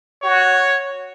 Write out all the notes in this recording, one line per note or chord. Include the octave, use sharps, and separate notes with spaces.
F#4 C#5